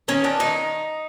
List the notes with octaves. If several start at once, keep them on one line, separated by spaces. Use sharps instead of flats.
D#3 C#4
D#3 D4
D#3 D#4